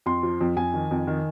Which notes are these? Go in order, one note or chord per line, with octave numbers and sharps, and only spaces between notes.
F2 C6
F3
F2
F2 G#5
D#3
F2
D#3